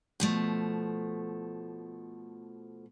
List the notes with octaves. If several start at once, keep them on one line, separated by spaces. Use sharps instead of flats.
B2 F3 A3